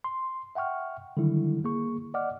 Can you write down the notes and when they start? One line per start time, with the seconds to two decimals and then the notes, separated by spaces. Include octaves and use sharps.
0.04 C6
0.55 E5 F#5 G5 C#6 F6
1.17 D3 D#3 F#3 G3 E4
1.64 A#3 G#4 C#6
2.14 D5 D#5 F#5 D6 F6